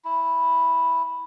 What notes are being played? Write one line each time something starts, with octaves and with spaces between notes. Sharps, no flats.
E4